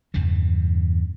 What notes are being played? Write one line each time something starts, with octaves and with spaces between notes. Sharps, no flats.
E2 G2 C#3 E3